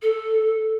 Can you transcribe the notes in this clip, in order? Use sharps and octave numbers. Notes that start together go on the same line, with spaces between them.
A4